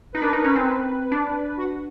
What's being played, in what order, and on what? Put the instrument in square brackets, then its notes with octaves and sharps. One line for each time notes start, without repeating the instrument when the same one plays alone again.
[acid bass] D#4 [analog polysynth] B4
[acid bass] D4 [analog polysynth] A#4
[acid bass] D#4
[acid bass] C#4 [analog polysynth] B4
[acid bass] C4
D4
[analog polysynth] F#4